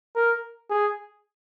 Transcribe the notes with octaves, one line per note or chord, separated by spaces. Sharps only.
A#4
G#4